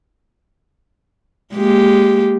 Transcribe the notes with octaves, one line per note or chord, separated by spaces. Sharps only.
G#3 A#3 G4